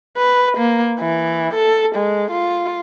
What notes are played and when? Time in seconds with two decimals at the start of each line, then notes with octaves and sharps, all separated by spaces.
0.17 B4
0.57 A#3
1.00 E3
1.54 A4
1.95 G#3
2.31 F4